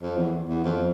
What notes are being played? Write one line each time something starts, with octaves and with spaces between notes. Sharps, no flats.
F2
E2
E2
F2